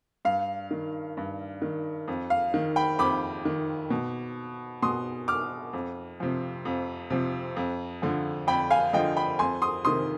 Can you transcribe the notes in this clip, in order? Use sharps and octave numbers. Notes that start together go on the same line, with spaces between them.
G2 F5
D#3
G2
D#3
F2
F5
D#3
G5 B5
F2 B5 D6
D#3
B2
B2 C6 D#6
D6 F6
F2
C3 F3
F2
C3 F3
F2
D3 F3
F2 G5 B5
F5 G#5
D3 F3 D#5 G5
G5 B5
F2 G#5 C6
C6 D#6
C3 D#3 C6 D#6